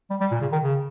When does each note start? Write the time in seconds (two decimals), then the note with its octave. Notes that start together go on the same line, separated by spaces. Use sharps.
0.10 G3
0.21 G3
0.31 A#2
0.41 C#3
0.52 D#3
0.63 C#3